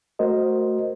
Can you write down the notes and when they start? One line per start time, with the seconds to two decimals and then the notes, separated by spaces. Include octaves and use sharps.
0.19 A3 F#4 A#4 C5 D#5